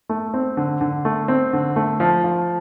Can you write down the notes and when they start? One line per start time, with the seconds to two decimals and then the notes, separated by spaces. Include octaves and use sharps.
0.09 A3
0.34 C4
0.57 D3
0.81 D3
1.05 A3
1.28 C4
1.53 D3
1.76 A3
2.00 F3
2.24 F3